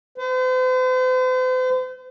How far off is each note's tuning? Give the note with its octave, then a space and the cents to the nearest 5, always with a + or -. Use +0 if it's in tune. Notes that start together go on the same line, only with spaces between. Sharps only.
C5 -45